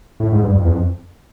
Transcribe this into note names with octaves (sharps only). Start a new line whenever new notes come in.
A2
G#2
G2
F2
E2
F2